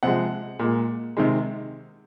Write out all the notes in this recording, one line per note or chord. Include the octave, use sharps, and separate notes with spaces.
C3 F3 G#3 F#5
A#2 G#3
C3 D#3 G#3